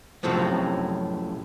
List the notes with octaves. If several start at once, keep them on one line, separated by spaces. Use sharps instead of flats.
F#2 A2 C3 F3 F#3